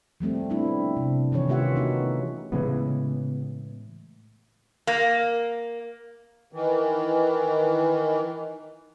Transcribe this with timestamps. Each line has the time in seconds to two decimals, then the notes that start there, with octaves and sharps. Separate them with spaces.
0.20 F3 G3 A3 C4
0.50 G3 B3 C4 D4 E4
0.97 C3
1.32 D#3 E3 C#4 C#5
1.48 C3 A3 F4 G4 E5 F#5
1.75 B3 D#4 F#4
2.52 A2 C#3 E3 G#3 B3
4.87 A#3
6.53 D#3 E3